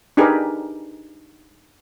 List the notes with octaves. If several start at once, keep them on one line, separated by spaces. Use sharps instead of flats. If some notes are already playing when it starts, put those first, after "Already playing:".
D4 D#4 G4 G#4 A#4 B4